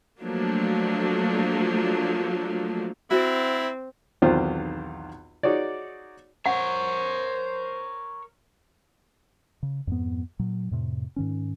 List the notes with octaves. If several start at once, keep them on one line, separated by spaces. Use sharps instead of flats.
F3 F#3 A3 A#3 D4
C4 E4 F#4
B1 E2 D#3 C4 F4 C5
D#4 F#4 G#4 C#5 D5
A#4 C5 C#5 F#5
C#3
F2 G#2 B3
A#2 F#3
F2 A2 C3
G#2 D#3 C#4